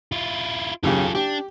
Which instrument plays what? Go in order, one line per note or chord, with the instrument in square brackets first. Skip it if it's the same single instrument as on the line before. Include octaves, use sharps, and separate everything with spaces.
[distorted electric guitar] E4 F4
[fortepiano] B1 C#3 G4 [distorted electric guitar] F4 A4
[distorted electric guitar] D4 [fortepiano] G4